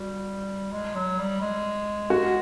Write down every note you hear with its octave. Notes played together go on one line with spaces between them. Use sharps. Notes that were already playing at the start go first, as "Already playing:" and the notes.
Already playing: G3 F#4
G#3
F#3
G3
G#3
F#4